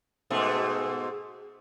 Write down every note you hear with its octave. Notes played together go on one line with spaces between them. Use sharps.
G#2 B2 A3